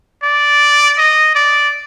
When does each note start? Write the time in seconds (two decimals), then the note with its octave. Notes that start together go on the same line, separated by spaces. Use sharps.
0.23 D5
0.98 D#5
1.35 D5